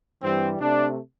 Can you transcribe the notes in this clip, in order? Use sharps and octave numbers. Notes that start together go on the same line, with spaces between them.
G2 E3 G3 C4
C3 A3 D4